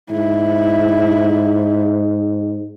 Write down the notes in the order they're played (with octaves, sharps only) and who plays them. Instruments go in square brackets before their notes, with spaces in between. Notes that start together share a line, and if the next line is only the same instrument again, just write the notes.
[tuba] G#2 [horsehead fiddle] E4